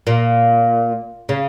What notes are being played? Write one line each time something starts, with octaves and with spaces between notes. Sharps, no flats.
A#2
C#3